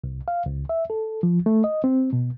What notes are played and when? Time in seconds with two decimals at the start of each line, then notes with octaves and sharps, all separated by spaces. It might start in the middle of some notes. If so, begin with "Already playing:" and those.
0.04 C2
0.28 F5
0.46 C#2
0.69 E5
0.90 A4
1.23 F3
1.46 A3
1.64 D#5
1.84 C4
2.13 B2